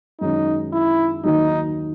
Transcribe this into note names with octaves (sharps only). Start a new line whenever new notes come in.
F#2 D#3 G#3 C#4 D#4
E4
D#2 D#3 F#3 D#4